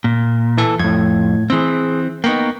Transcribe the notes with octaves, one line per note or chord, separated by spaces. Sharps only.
A#2
E3 A4
F2 A2 G#6
E3 C4 G#4 C6
A#3 B3 D#4 G5 C#6